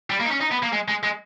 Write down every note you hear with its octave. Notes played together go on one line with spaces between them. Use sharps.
G3
A#3
D#4
C#4
D#4
B3
A#3
G#3
G#3
G#3